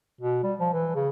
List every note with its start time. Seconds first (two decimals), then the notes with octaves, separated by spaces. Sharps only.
0.21 B2
0.43 G3
0.59 F3
0.73 E3
0.95 C#3